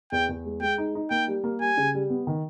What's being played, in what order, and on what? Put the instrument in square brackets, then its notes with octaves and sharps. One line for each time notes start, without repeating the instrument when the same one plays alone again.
[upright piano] E2 [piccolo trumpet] G5
[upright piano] E2
G#3
[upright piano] G#3 [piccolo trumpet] G5
[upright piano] D#4
D#4
[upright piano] A#3 [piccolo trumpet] G5
[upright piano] G3
A#3
[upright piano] G3 [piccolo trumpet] G#5
[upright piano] C#3
G3
B3
D#3